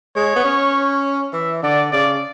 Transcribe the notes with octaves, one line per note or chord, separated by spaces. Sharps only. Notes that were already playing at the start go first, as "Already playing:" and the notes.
G#3 C#5
B3
C#4
E3 E5
D3 D5
C#3 D5